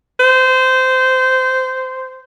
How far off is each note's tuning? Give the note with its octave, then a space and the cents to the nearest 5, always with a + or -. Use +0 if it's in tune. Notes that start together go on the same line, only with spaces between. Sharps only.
C5 -20